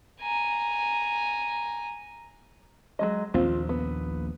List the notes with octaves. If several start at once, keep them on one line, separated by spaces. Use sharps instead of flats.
G#5 A#5
F#3 G#3 D#5
A#1 D#2 A#3 C4 F4
B3